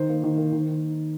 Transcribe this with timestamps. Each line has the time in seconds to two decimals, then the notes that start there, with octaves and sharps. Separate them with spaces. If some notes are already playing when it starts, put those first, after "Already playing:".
Already playing: D#3 C5
0.09 A#3
0.24 D#3
0.38 A#3
0.52 D#3